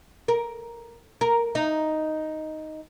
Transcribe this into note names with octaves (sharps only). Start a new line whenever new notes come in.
A#4
A#4
D#4